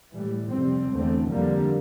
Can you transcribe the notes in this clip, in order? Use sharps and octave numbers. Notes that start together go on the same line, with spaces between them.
A2 E3 G3
F2 C3 G3 C4
E2 D3 A3 C4
F2 D3 G3 A#3